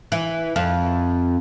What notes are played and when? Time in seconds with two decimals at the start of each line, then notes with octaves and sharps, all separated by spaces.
0.12 E3
0.56 F2